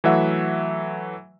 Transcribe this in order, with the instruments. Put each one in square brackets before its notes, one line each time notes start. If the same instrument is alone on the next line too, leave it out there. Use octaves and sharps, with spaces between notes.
[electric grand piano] E3 F#3 A3 E5 F#5